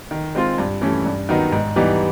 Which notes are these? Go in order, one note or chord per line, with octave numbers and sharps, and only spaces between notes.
D#3
G#3 C4 F4
G2
E3 A3 C#4
G2
D#3 F#3 B3 D#4
G#2
E3 G3 B3 D#4